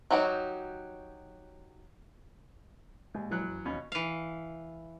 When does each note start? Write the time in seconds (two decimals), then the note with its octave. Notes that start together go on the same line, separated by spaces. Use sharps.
0.10 F#3 D#4 F#4 G4 C#5
3.14 D#2 A#2 G#3
3.31 E3 F#3 F#6
3.46 F#1
3.66 D#2 B2 C#4
3.92 E3 F5